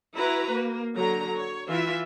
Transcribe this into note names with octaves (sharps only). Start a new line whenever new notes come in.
E4 F#4 B4 A#5
A#3
D3 F#3 A#5
C#5
E3 F4 E5